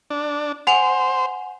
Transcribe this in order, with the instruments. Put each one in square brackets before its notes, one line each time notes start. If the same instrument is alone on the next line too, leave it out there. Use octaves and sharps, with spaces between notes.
[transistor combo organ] D4
[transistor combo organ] C5 [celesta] F#5 G#5 F7